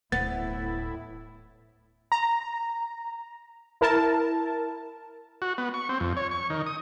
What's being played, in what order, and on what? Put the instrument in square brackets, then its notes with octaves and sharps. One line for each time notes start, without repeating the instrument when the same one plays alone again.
[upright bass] D1 [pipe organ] A2 E4 [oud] B3 [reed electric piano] A6
[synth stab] A#5
E4 A#4 A5
[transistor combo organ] F#4
B3
C#6
C4
F2
C#5
C#6
D#3
D#6